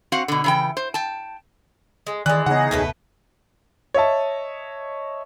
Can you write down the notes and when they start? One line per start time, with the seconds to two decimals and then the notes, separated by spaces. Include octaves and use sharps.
0.12 C4 F#4 F5 F#5
0.28 B2 D3
0.44 C#3 E3 G5
0.77 C5
0.94 G5 A5
2.07 G#3
2.26 D#3 E3 G#3 D5 F#6
2.46 C#3 B3 D#4 G#4 C#5 F#5
2.71 E1 C#2 B2 A3 B4
3.94 C#5 D#5 E5 A5